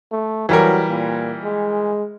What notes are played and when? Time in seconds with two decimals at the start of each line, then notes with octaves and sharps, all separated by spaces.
0.12 A3
0.49 E3 F#3 G3 A#4
0.89 A#2
1.44 G#3